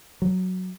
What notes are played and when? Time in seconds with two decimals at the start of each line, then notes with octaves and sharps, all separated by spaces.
0.22 F#3